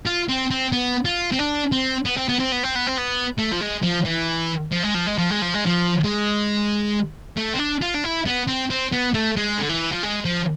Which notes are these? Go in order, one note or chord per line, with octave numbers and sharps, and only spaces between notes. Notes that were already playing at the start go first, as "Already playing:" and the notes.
F4
C4
C4
B3
F4
C4
D4
C4
B3
C4
B3
C4
B3
C4
B3
C4
B3
A3
F3
G#3
F3
E3
F3
G#3
F3
G#3
F3
G#3
F3
G#3
F3
G#3
A3
C4
D4
F4
D4
E4
B3
C4
C4
B3
A3
G#3
D3
E3
F3
G#3
F3